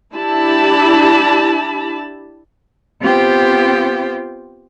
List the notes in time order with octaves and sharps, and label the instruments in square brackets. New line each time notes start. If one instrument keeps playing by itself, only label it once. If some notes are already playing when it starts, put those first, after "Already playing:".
[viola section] D4 E4 G4 A5 B5
[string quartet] B3 C4 F4 G4 C5 G5